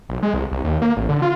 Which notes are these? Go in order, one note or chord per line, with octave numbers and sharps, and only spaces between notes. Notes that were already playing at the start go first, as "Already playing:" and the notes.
B1
G#3
C2
C2
D#2
A#3
A1
D3
F4